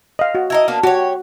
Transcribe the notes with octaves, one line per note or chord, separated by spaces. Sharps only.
D#5 F5
F#4
E4 A#4 D#5
A#3 B3 D4
F#4 G4 C#5